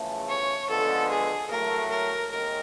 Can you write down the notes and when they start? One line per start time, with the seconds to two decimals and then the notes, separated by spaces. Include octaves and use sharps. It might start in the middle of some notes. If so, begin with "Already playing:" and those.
Already playing: E2 C#3 F3 A3
0.29 C#5
0.70 D3 F3 G#3 B3 A4
1.10 G#4
1.50 A2 F#3 A3 A#4
1.91 A#4
2.31 D#2 D#3 G#3 A#4